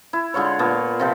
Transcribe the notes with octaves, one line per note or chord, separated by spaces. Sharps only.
E4
D3 G#3 F4 C#5
A#2 B3 A5 C#6
C3 F3 G5